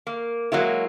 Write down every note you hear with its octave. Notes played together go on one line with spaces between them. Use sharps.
A#3
F#3 G#3 A#3 E4